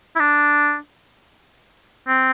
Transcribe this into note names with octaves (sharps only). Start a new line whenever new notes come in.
E4
D4
C4